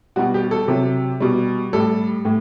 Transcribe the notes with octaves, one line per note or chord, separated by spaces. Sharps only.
B2 G3 F#4
G4
A4
C3 F#3
B2 G3
A2 G3 A4
A2